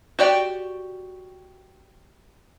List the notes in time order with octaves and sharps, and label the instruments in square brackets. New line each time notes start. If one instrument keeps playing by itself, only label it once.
[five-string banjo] F#4 G4 D5 G5